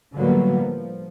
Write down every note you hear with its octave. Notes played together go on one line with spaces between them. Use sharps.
A2 D3 F#3 G3 A#3 B3
F3